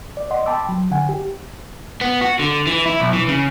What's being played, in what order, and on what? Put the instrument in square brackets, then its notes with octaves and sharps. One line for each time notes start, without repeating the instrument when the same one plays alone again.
[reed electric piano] D5
D5 D#5 F#5 C6
G5 A5 B5 C6 D6 E6
F#3
D3 F#5 G#5
G4
[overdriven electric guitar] B3
F#4
D3
E3
E4
B1
E3
C#3